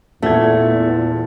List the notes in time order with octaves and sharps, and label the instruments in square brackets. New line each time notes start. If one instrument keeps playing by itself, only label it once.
[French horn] E2 [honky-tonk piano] A#2 F#5 G#6 [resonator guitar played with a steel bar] A3